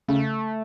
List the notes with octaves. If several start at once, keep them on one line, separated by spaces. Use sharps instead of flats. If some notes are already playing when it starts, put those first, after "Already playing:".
C#3 A3